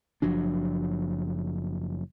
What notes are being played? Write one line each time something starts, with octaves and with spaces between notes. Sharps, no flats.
F#1 F3 F#3 D4